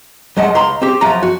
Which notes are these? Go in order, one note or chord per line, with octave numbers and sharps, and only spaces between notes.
F#2 G#3 D#5 F#5 A5
C#2 A#5 C6
C4 G4
F#2 F3 F4 A#5
F#4